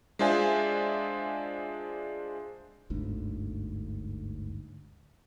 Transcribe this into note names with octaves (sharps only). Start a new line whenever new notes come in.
G#3 D4 F4 C5 E5 G#5
G1 D2 G#2 D4